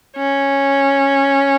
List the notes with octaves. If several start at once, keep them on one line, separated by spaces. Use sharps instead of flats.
C#4